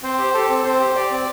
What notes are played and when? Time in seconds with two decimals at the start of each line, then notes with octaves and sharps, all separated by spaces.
0.03 C4 C5
0.18 G4
0.34 G4 A4
0.49 C4
0.64 C4 C5
0.80 G4
0.95 G4 D5
1.10 C4